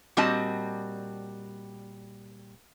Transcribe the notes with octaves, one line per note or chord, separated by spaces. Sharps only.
A#2 G3 C4 F#4 D#5 A5